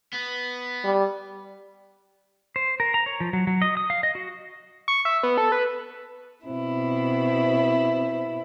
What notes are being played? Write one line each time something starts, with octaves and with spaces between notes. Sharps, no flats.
B3
G3
C5
A#4
A#5
C#5
F3
F#3
F#3
D#5
D#6
F5
D#5
F#4
C#6
E5
B3
A4
B4
B2 C4 E4